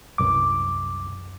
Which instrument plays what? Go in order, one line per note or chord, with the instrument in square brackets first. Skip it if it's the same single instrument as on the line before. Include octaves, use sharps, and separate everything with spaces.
[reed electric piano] C2 F#2 D6